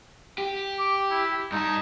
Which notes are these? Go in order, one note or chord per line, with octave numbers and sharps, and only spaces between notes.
G4
D6
E4
G2 D#4 A5